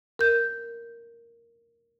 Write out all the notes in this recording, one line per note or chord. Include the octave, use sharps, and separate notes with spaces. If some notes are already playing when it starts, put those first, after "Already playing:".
A#4 G6